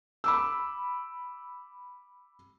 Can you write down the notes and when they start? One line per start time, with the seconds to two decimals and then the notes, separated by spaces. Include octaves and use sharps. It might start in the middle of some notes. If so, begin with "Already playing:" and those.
0.24 B5 D6 E6